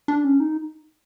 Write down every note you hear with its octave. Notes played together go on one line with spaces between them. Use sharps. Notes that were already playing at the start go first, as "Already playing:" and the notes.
D4
C#4
D#4